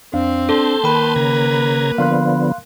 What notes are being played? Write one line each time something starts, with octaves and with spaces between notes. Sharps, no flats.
F2 C4 D4 F5
D4 A4 A5 C6 G6
D#3 A#3 B4 G5 B5
C#3 A#5 G#6
D3 F3 B3 F5 C6 F#6